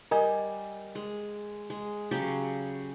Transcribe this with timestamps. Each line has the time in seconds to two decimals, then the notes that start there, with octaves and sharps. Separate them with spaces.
0.11 G3 A#4 D#5 G#5
0.95 G#3
1.70 G#3
2.11 C#3 F#3 G4